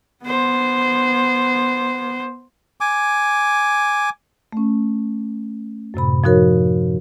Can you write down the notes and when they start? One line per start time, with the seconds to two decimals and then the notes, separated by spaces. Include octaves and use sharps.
0.24 B3 C5
2.81 G#5 D6
4.53 A3 C#4
5.94 F#2 A2 C3 B5
6.24 F3 D#4 F#4 A#4 C#5